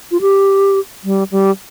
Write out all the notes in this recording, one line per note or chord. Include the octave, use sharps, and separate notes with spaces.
F4
G4
G3
G3